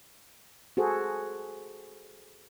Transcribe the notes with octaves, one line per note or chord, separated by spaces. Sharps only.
F#4 G#4 A4 C5